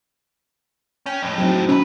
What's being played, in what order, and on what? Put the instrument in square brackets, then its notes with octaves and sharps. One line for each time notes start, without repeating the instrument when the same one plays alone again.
[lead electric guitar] C#4 [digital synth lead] G5
[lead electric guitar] F2 A2
[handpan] F#3 C4 D#4
[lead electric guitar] B1 B4 [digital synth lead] C#4